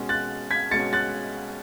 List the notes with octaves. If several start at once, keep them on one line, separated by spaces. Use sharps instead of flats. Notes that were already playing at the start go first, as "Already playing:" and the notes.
Already playing: B2 G#3 C#4
F#6 A6
G#6 B6
B2 G#3 C#4 A6 C#7
F#6 A6